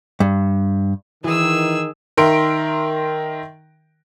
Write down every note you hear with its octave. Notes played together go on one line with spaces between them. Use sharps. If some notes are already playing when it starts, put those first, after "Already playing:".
G2
D#3 E3 G#4 E6
D#3 A#4 E5 C6 D7